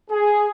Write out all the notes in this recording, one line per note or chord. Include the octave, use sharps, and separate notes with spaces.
G#4